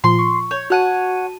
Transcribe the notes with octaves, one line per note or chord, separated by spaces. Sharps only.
A#2 F3 F4 C6
C#6
C#5 G6
F#4 C#5 F#5 A5 D#7